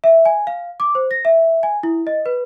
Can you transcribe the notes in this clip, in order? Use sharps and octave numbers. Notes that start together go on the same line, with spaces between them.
E5
G#5
F5
D6
C5
A#6
E5
G#5
E4
D#5
B4